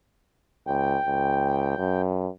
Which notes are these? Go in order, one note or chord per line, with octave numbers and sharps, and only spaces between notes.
C#2 G5
C#2
F#2